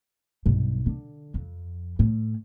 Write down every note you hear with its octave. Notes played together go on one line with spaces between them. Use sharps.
B1 G2
D3
F2
A2